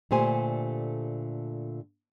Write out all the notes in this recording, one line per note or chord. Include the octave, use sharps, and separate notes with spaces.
A#2 D3 A3 G4 C5 G#5